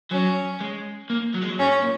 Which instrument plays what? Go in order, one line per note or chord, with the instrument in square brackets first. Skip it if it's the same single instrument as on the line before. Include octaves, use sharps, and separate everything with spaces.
[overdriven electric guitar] F#3 [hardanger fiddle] C#4
[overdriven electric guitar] G#3
A#3
F#3
G#3
F#3
[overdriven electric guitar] G#2 [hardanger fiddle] C#4
[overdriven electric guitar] A#2